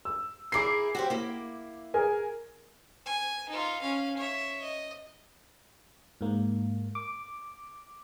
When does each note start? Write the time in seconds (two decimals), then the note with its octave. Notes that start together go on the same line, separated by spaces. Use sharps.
0.05 E6
0.52 E4 G#4 A#4 D6 C7
0.95 F#4 G4 C5
1.10 A#3 E4
1.94 G#4 A#4 G#5
3.06 G#5
3.49 D#4 F4
3.82 C#4 F5
4.17 C#5 E5
4.62 D#5
6.21 G#2 A#3
6.95 D6